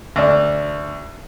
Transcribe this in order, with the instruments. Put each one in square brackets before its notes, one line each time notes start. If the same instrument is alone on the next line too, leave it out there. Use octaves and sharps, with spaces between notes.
[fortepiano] D2 D4